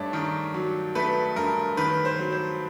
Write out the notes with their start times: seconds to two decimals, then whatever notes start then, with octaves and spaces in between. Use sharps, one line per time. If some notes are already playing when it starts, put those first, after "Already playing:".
Already playing: G2 A3 C#5 D5
0.13 D#3 A#4
0.54 F#3
0.95 A3 B4
1.36 G2 A#4
1.77 D#3 B4
2.05 C5
2.18 F#3
2.32 C5